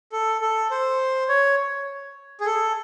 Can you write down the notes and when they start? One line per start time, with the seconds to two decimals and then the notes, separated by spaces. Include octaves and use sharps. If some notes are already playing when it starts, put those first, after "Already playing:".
0.12 A4
0.41 A4
0.71 C5
1.29 C#5
2.40 G#4
2.46 A4